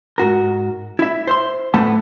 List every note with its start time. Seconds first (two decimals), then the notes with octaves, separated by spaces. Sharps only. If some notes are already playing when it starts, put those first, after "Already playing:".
0.18 G#2 F#4 A#4
0.99 E4 E5
1.27 C5 E5 C6
1.74 A2 A3 B3 B4 F#5 A5